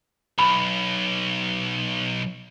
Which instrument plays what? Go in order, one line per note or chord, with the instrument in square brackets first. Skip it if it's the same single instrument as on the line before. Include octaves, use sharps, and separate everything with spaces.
[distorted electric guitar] B1 [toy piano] B5